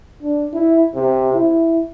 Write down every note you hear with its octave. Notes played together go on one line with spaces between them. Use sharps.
D4
E4
C3
E4